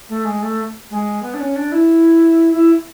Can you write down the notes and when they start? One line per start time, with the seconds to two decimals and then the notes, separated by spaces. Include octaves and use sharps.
0.09 A3
0.25 G#3
0.42 A3
0.91 G#3
1.22 B3
1.34 D4
1.40 C#4
1.56 D4
1.72 E4
2.53 E4